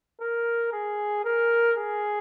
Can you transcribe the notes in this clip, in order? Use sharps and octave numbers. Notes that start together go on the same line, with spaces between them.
A#4
G#4
A#4
G#4